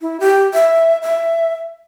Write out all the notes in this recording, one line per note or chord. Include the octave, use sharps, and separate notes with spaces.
E4
G4
E5
E5